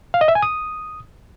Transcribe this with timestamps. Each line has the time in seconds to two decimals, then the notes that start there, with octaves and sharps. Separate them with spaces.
0.14 F5
0.21 D#5
0.28 E5
0.35 G#5
0.42 D#6